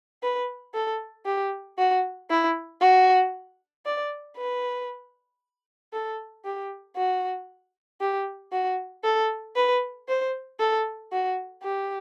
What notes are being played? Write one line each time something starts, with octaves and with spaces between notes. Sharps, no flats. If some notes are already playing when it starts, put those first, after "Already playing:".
B4
A4
G4
F#4
E4
F#4
D5
B4
A4
G4
F#4
G4
F#4
A4
B4
C5
A4
F#4
G4